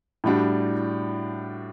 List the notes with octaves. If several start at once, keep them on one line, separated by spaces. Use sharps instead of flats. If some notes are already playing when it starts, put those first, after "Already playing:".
A2 G3 D4 F#4